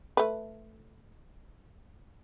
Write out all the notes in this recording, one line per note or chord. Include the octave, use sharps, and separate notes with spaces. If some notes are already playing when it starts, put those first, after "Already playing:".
A3 B4